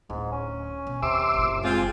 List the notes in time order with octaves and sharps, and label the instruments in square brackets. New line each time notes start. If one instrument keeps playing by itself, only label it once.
[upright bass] D1 [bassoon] G#2
[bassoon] C#4
[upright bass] B2
[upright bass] D#2 [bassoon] C3 [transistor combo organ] C6 D6 E6
[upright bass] F#1 A#2
[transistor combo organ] G#3 [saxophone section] C4 F4